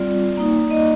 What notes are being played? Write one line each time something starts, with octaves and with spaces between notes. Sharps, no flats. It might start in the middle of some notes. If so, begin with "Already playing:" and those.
Already playing: G3 C4 F4 D5
A#3 D#4
D#5